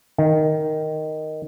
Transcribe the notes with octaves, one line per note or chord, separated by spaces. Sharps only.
D#3